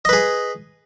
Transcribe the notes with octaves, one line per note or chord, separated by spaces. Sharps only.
G#4 B4 D#5